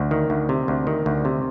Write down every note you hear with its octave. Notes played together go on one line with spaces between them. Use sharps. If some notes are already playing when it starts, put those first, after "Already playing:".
Already playing: D2
D#3
D2
C3
D2
D#3
D2
C3